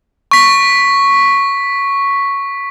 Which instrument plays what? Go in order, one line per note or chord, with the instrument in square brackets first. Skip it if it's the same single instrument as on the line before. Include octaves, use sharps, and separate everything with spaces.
[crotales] C#6 B6